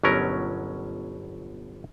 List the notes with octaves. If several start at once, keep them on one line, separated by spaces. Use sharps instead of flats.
G1 B2 F#3 C#4 A#4